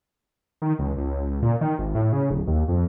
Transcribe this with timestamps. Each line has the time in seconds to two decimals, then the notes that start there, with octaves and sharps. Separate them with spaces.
0.62 D#3
0.79 C#2
0.97 C#2
1.42 A#2
1.61 D#3
1.79 G#1
1.95 A2
2.13 C#3
2.30 D1
2.47 D#2
2.68 F2